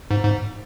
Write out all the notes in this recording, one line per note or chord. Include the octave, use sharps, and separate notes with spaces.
G#2
G#2